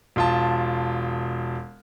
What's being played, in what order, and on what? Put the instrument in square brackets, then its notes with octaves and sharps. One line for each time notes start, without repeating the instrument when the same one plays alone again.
[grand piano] E1 F4 A5